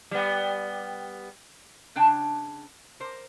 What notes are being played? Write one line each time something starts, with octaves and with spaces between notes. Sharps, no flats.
G3 B3
C#3 D4 G5 A5
A#4 C5